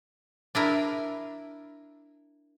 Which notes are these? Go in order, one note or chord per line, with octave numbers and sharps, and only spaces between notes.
D4 E4 A#4